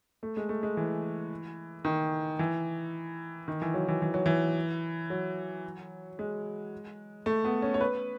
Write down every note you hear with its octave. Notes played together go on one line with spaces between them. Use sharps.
A3
G#3
A3
G#3
E3
D#3
E3
D#3
E3
F#3
E3
E3
F#3
E3
F#3
G#3
A3
B3
C#4
C#5
B4